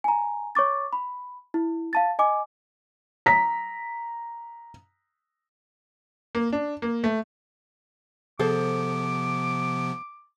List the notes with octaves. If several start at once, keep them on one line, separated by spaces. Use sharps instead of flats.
G#5 A#5
C#5 C#6 D6 A6
B5
E4
F5 A5 A6
D#5 G#5 D6
A#5 B6
A#3
D4
A#3
A3
C3 F3 B3 G#4 A4 C5 D6